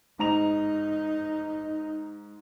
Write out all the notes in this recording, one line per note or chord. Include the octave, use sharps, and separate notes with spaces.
G#2 D#4 A#5 F7